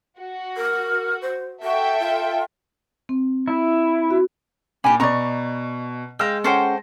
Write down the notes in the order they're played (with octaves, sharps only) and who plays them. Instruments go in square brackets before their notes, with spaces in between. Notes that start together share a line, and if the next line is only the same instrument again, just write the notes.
[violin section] F#4
[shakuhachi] A#4
C5
[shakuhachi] F#4 [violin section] A4 E5 G5
[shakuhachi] F4
[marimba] C4
[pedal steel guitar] E4
[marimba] F#4
[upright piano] A#2 [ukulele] D4 G#5 [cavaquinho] G4 B5
[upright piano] B2 [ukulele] D5 D#5 B5 [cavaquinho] A#5 C#6
[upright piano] G#3 E6 A#6 [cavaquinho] F5 G5
[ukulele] C#4 F#5 [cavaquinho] A4 C5 G5